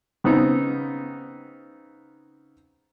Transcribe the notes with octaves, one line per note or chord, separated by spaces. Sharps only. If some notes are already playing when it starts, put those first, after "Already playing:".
C#3 B3 C4 D#4